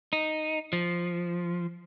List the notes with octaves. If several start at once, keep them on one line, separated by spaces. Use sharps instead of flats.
D#4
F3